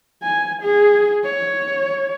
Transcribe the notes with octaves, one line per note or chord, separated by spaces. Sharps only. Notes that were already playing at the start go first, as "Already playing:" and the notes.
G#5
G#4
C#5